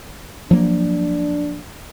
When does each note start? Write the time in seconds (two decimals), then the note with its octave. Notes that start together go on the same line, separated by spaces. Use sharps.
0.51 F3 F#3 A#3 D4